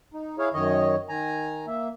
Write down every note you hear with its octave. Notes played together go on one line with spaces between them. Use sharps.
D#4
E4 G#4 C#5 F5
F#2 D#3 C#5 D#5
D#3 G#5 A#5
A#3 E5